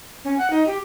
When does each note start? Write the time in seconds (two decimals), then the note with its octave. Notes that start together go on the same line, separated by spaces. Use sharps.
0.25 C#4
0.38 F#5
0.50 D#4
0.67 G4